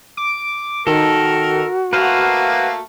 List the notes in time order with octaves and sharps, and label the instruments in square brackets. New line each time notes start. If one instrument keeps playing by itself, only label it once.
[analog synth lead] D6
[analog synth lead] D#3 [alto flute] F#4 [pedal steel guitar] A4 [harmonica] A#4
[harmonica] A3 A#3 [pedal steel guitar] B4 C5 F#5 [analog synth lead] F5